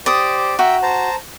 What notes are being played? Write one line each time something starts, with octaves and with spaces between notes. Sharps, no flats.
G4 C5 D5 D#6
F#4 E5 G5 A#5
C5 A5 A#5